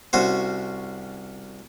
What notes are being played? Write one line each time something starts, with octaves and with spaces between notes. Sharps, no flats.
C2 C#4 F#4 C5